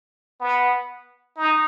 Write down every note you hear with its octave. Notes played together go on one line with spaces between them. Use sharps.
B3
D#4